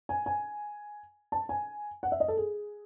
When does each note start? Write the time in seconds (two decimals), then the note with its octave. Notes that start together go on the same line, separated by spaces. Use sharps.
0.09 G#5
0.26 G#5
1.32 A5
1.49 G#5
2.03 F#5
2.12 E5
2.20 D#5
2.28 A4
2.37 G#4